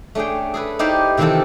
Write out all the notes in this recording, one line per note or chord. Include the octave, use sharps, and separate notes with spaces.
A3 C#4 D4 G#4 G5
G#4 A4 B4
D#4 E4 G4 C5 D5 F5
C3 D#3 E3 C4 F4 A4